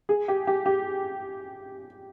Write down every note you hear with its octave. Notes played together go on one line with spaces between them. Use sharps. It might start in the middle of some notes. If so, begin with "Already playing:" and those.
G#4
G4
G4
G4